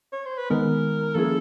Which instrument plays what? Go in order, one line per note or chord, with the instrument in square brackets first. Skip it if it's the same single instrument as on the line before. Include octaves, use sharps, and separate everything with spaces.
[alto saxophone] C#5
C5
B4
[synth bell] D#3 G#3 B3 D#4 [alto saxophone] A#4
[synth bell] F3 A#3 C#4 E4 G#4 [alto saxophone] A4